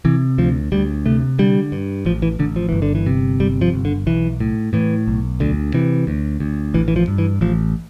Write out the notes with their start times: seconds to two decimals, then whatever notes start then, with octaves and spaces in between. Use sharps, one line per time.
0.05 C3 E3
0.38 D2 F3
0.72 D2 G3
1.06 C3 A3
1.39 D3 G3
1.72 G2
2.05 A1 F3
2.22 E3
2.39 A1 D3
2.56 F3
2.69 G1 E3
2.82 D3
2.95 E3
3.06 C3
3.40 G1 G3
3.61 F3
3.74 G1
3.85 D3
4.06 B1 E3
4.40 A2
4.73 A2 E3
5.08 B1
5.40 D2 D3
5.74 C3 E3
6.07 D2
6.40 D2
6.74 A1 E3
6.88 E3
6.96 F3
7.08 G2
7.18 E3
7.41 A1 F3